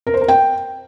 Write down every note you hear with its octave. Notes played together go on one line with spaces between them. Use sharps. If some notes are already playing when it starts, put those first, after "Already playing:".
A#4
C5
A#4
G5